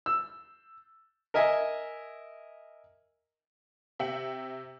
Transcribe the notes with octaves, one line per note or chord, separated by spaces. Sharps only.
E6
A#4 D#5 E5 G#5
C3 E5 G5 C#7 F#7